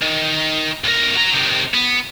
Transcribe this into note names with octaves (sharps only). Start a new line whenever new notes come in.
D#3
B1 A#4
F#4 A#5
C3 D#3
B3